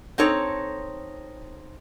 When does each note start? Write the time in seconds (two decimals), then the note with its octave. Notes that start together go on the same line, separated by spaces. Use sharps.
0.18 C4 D#4 A4 C#5